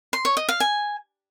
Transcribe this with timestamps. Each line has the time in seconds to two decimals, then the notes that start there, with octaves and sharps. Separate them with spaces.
0.13 C6
0.25 C#5
0.37 D#5
0.49 F5
0.60 G#5